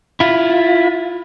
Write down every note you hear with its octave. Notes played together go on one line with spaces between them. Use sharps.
E4 F4